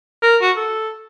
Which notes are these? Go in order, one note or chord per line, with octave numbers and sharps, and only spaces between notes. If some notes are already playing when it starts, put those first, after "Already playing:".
A#4
F#4
A4